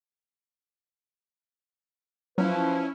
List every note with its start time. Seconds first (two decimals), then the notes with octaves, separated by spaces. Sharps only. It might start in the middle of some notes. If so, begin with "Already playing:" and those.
2.38 F3 F#3 C#4 E4 B4